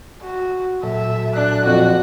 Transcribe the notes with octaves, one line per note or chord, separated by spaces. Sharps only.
F#4
A#2 F#3 A4 E5
D4 F#6
F2 F#4